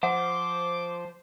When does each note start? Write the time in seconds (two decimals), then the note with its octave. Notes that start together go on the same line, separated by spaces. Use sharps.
0.03 F3 C5 F#5 D6